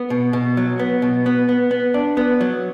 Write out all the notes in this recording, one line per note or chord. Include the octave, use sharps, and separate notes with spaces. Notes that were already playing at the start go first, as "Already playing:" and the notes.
Already playing: B3
B2
B2
F#3
B3
B2
B3
B3
B3
D4
B3
F#3